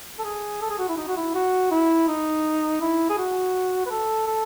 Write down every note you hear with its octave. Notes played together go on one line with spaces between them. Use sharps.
A4
G#4
A4
G#4
F#4
E4
D#4
F#4
E4
F#4
E4
D#4
E4
G#4
F#4
B4
A4
A4